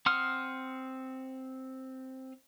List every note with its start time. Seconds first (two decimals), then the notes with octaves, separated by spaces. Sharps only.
0.06 C4 F#5 C6 D#6 F6